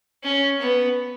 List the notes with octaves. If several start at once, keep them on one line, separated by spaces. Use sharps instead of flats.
C#4
B3